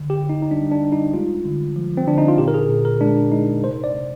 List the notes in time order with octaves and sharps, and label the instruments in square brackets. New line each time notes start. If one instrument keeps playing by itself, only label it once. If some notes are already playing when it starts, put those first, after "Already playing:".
Already playing: [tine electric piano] D3
G4
D3
D#4
D#4
G3 D4
D4
G3
D#4
G#3 F4
D3
F3
C4
D3 D4
D#4
F4
A#2 G4
A#4
G#4
A#2
A#4
G#3 D4
G#3 D#4
C3 C5
D5
C3